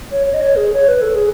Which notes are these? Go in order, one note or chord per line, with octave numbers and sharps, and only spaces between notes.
C#5
C#5
D#5
C#5
G#4
C#5
B4
A4
G#4